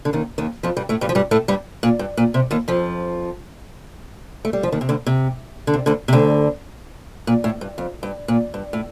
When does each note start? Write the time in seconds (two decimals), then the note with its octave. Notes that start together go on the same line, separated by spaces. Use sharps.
0.05 D3
0.13 D#2 D#3
0.38 D#2 D#3
0.63 F2 F3
0.77 G2 G3
0.89 A2 A3
1.01 G2 G3
1.09 F3
1.15 G2 G3
1.31 A2 A3
1.48 G2 G3
1.83 A#2
1.99 G2
2.17 A#2
2.34 C3
2.51 D#2 D#3
2.68 F2 F3
4.45 A3
4.53 G3
4.63 F3
4.72 D#2 D#3
4.81 C3
4.89 D2 D3
5.06 C3
5.67 D3
5.74 C3
5.86 D2 D3
6.08 C3
6.13 D2 D3
7.27 A#2
7.44 A2
7.61 G2
7.78 F2
8.03 G2
8.28 A#2
8.54 G2
8.73 A2